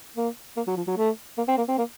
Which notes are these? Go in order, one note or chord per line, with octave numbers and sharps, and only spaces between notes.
A#3
A#3
F#3
F3
F#3
A3
A#3
C4
A#3
C4
A#3